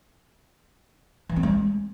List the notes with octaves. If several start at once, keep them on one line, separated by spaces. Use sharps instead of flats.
E3
C4
G#3